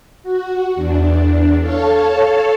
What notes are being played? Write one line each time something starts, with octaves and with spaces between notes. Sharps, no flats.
F#4
E2 D4
A4 C#5 F5 A5